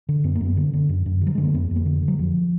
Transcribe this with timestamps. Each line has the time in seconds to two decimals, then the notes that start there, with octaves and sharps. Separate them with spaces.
0.09 D3
0.24 F#2 B3
0.35 A#3
0.41 F#2 B3
0.57 D3
0.73 D3
0.89 F#2
1.06 F#2
1.21 D3
1.27 F#3
1.35 D3 G#3
1.44 A#3
1.54 F2 B3
1.71 F2
1.76 A#3
1.86 D3
2.02 D3
2.08 F#3
2.19 F2 F3